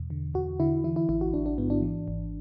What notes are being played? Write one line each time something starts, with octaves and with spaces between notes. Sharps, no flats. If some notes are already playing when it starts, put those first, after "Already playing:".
Already playing: E2 B2
D3
E2 F#4
D3 E4
E3 E4
E4
A1 E4
F#4
A1 D4
D4
G#2 B3
D4
E3
G#1